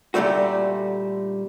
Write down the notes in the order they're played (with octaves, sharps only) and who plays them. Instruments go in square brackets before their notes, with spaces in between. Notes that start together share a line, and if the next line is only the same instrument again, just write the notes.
[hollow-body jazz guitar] A#2 D3 D#3 G3 A3 F#4